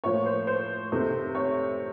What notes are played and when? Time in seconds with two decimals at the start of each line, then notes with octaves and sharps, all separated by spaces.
0.04 A2 F3 A#3 C#5
0.26 C5
0.47 C5
0.92 C3 D#3 A3 C4
1.35 C#5